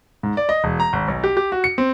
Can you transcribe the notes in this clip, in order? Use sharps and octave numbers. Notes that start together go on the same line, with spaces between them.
G#2
D5
D#5
E1
A#5
G#1
B1
G4
G4
F#4
C#7
C4